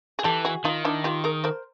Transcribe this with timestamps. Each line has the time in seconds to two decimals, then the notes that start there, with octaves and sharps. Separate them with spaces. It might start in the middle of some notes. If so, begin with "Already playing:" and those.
0.19 G#4
0.24 E3 G4 A4
0.45 F#4 G#4
0.64 D#3 D#4 F4
0.85 D4 E4
1.04 F4 G4
1.24 G#4 A#4
1.44 A#4 C5